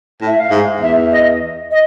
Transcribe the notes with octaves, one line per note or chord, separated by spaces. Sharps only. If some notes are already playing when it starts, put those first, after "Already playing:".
A2
E5
F5
G#2
E2 E5
D#5
D#5